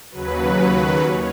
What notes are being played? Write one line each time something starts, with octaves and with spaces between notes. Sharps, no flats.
D#2 C#3 F#3 B4
D#2 C#5